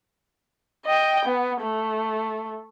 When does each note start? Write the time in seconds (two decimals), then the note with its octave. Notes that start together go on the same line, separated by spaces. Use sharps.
0.86 D#5 G5
1.26 B3
1.62 A3